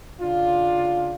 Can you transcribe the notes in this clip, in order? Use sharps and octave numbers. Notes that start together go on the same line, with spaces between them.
C#3 D4 F4